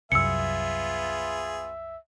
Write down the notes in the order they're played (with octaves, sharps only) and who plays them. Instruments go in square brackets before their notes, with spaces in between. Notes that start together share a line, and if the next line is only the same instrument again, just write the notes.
[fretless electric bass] C2 F#2 [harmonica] B3 F4 G#4 [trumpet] E5 [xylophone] E6 C#7